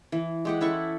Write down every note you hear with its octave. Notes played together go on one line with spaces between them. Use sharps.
E3
G#3 G4 F#5
C#4 E4 A4 C#6